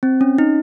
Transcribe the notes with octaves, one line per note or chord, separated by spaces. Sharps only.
C4
C#4
D#4